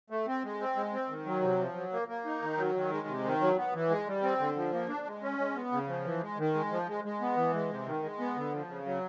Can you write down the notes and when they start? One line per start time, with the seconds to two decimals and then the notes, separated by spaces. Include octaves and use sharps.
0.10 A3
0.27 C4
0.44 G#3
0.60 C4
0.76 G#3
0.93 C4
1.09 D#3
1.26 F#3
1.42 C3
1.59 F3
1.75 F#3
1.92 A#3
2.08 A#3
2.25 D#4
2.42 D#3
2.57 F#3
2.75 D#3
2.91 G#3
3.07 C3
3.25 D#3
3.41 F#3
3.57 B3
3.74 E3
3.90 G#3
4.07 G3
4.23 C4
4.39 D3
4.56 F3
4.73 A#3
4.89 D4
5.06 G#3
5.22 C#4
5.39 G#3
5.55 B3
5.72 C#3
5.88 F3
6.05 E3
6.21 G#3
6.38 D#3
6.54 G#3
6.71 F3
6.88 G#3
7.05 G#3
7.21 B3
7.37 E3
7.53 G#3
7.70 C3
7.86 D#3
8.03 G#3
8.19 B3
8.36 D3
8.53 F3
8.69 C#3
8.85 F#3